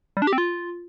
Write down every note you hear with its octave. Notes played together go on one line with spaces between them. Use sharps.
G3
D4
G4
C4
F4